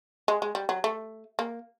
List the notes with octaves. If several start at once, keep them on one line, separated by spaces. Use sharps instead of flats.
G#3
G#3
G3
F#3
A3
A#3